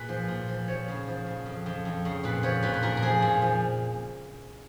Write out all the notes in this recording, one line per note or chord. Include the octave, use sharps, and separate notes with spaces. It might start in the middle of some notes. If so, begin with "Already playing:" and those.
Already playing: A#2 G#4 B4
F3
A#2
F3
F3 C#5
C#3
F3
C#3
F2
F2
F2
C#3
A#2 B4
F3 C#5
A#2 B4
B4
A#2 A#4
A#4
F3 G#4
A#2
F3